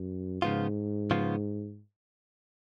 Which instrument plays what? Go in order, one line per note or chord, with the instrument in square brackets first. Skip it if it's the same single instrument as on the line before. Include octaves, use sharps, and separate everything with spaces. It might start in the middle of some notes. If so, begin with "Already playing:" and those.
Already playing: [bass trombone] F#2
[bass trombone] G#2 [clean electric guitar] C#3 F3 B3 F4
[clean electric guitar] C#3 F3 B3 F4